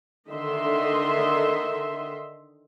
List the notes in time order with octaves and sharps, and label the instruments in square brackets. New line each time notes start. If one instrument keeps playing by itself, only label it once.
[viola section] D3 D#3 D#5 E5 C6